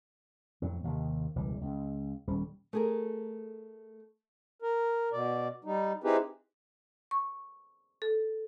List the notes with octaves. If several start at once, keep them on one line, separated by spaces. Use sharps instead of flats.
F2 A2 F#3
D#2 C3 D#3
E1 C#2 E3 G3
C#2
D#1 G3 C#4
A3 G#4 A#4
A#4
B2 D5
G3 D#4
C4 D#4 E4 G4 G#4 B4
C#6
A4